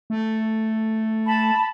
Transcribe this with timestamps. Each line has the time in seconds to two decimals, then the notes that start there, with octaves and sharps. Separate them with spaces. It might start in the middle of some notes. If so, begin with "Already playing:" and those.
0.10 A3
1.26 A5 B5